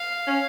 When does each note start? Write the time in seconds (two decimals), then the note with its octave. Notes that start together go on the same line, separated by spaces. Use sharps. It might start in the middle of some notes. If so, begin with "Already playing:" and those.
Already playing: F5
0.27 C#4